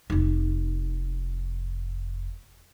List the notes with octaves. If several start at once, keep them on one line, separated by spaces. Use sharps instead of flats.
F1 D#4